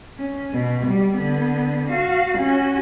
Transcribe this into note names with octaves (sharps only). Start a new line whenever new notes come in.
C#4
B2
G3
D3 B3
F#4 F5
C#4 F#4